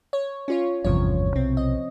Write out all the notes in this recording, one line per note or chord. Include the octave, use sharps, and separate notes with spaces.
C#5
C#4 F4 C#5
G#1 E2 G2 C3 F3 C#5
B1 C3 C4
D#5